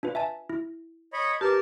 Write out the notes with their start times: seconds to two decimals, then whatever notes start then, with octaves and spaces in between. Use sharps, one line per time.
0.03 D4 F4 B4
0.15 E5 G#5 A5
0.50 E4
1.13 C#5 D#5 B5
1.41 G4 A#4 B4 A5 D6